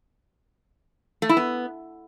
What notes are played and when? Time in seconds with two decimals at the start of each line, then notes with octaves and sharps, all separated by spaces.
1.22 A3
1.29 E4
1.37 B3